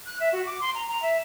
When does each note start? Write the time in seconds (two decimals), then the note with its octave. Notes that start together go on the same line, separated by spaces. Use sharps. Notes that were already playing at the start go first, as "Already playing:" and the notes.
0.06 F#6
0.20 E5
0.33 F#4
0.46 D6
0.61 C6
0.75 A#5
0.88 A#5
1.02 E5